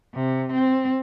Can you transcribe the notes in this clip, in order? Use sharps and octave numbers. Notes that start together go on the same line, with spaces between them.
C3
C4